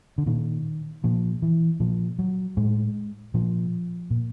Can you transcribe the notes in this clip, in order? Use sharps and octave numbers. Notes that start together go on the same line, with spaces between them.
D3
A#2 D#3
A#2 F3
E3
A#2 F3
F#3
A2 G#3
A#2 F3
A#2